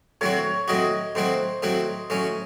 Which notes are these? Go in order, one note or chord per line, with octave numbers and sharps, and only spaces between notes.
A2 F#3 C4 F#4 C#5
A2 F#3 C4 F#4 D#5
A2 F#3 C4 F#4 C5
A2 F#3 C4 F#4
A2 F#3 C#4 C#5